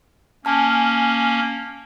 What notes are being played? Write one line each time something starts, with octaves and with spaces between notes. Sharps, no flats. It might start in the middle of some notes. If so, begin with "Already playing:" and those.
A#3 C#4 G#5 A5 F6